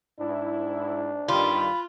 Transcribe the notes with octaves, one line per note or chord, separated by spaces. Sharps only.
G#2 D4 E4
G2 D#3 G3 F4 B5